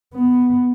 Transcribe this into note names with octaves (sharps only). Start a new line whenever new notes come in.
B3